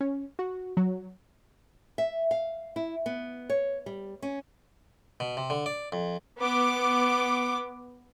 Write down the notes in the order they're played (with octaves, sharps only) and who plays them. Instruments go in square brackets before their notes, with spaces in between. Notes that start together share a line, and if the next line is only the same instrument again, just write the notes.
[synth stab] C#4
F#4
F#3
[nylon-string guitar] E5
F5
E4
B3
C#5
G3
C#4
[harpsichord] B2
C3
D3
D5
F2
[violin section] B3 D6